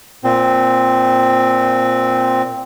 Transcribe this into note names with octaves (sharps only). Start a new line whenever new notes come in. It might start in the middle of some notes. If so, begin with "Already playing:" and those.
A#2 C4